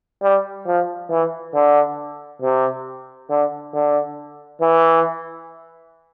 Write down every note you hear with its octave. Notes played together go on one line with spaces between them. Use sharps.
G3
F3
E3
D3
C3
D3
D3
E3